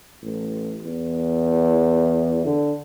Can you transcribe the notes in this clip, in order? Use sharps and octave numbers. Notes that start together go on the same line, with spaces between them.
A1
E2
D3